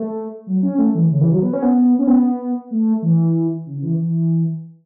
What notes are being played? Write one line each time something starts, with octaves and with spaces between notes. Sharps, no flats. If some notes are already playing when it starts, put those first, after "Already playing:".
Already playing: A3
F#3
C#4
A3
E3
C#3
E3
F#3
B3
C#4
B3
C#4
B3
A3
E3
C#3
E3
E3